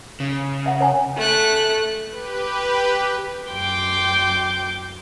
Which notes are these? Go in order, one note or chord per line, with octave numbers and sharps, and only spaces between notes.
C#3
E5 F#5
C#5 G#5
A3 F#6
G4 B4
F#2 G5 C6 D6